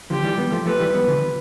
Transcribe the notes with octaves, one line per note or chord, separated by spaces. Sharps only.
D3 F3 G4
E3 G3
G3 B3
F3 A3
F3 A3 B4
E3 G3
G3 B3
D3 F3